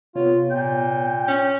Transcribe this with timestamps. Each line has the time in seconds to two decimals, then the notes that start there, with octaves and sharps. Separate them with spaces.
0.15 C3 B3 F4 C#5
0.51 A#2 G5
1.28 C#4